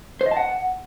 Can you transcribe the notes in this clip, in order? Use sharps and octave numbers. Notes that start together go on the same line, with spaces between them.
C5
D#5
A5
F#5